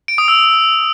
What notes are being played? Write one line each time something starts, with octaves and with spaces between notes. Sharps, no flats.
D7
D#6
E6